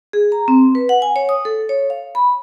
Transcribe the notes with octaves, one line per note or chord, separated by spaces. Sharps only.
G#4
A#5
C4
B4
F#5
G#5
C#5
D#6
A4
C#5
F5
B5